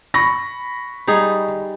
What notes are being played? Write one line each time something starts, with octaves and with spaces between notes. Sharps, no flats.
B5 C#6 A#6
G3 D#4 G#4